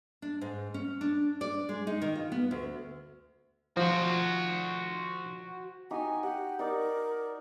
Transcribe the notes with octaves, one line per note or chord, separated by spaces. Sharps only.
D4
G#2
C#4
D4
D5
G#3
D#4
D#3
F4
B3
D2
F3 F#4 C5
D#4 F#4 G4 G#5
G4 F#5
D#4 A#4 D5